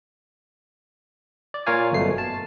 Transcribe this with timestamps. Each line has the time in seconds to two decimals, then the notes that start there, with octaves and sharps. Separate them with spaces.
1.54 D5
1.66 A#2 F4 A#4 C#5 F5 G#5
1.92 G1 F#2 B2 A3 C7
2.18 A5